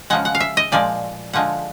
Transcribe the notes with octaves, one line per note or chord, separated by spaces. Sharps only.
C#3 F3 G#3 F#5
F#5
F5
E5
D#5
A#2 F3 G#3 D5
D3 F3 G#3 F#5